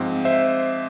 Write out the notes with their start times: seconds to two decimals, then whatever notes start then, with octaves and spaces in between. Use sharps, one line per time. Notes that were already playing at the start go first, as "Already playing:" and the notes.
Already playing: G#2 F3 C4
0.25 C5 E5